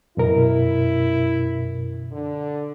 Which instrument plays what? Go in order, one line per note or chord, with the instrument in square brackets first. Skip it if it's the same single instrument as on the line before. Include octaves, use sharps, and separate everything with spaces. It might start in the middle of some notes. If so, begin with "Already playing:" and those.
[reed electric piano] F#2 B2 A#4 [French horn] E4
[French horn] D3